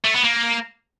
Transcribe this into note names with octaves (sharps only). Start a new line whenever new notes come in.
A3
B3
A#3